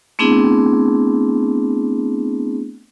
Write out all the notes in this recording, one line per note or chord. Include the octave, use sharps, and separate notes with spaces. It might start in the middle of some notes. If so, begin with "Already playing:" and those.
A3 B3 C4 D4 E4 G#4